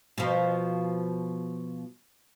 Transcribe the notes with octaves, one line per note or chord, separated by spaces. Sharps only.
B2 F3